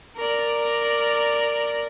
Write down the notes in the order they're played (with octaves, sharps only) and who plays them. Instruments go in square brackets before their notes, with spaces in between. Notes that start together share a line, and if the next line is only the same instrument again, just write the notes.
[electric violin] A#4 D5